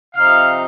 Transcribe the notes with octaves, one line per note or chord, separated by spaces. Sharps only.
C3 F3 C4 D#4 F5